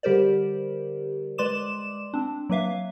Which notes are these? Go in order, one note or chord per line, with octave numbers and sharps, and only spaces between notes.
D3 G3 G4 A#4 C5 D5
G#3 B4 D5 C6 D6 E7
C4 D4
F#3 A#3 B4 E5 F5